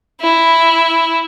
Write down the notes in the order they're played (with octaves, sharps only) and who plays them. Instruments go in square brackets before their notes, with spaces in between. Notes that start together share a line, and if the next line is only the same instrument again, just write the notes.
[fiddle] E4